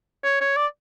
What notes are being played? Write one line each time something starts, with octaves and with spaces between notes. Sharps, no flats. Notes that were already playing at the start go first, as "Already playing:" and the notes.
C#5
C#5
D5